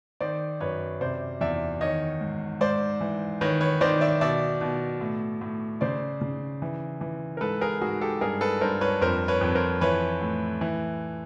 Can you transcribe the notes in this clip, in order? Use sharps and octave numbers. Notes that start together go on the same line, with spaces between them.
D#3 C5 D5
F#2 B4 C#5
C3 C5 D5
E2 D5 E5
D#3 C#5 D#5
G#2
G#2 C5 D5
E3
D#3 B4 C#5
B4 C#5
D#3 C5 D5
D5 E5
B2 D5 E5
B2
A2
A2
C#3 C5 D5
C#3
E3
E3
A#4
G#2 A4 B4
G#4 A#4
G#2 F#4 G#4
G4 A4
G2 G#4 A#4
A4 B4
G2 A#4 C5
B4 C#5
F2 A#4 C5
B4 C#5
F2
A#4 C5
E3 B4 C#5
A2
E3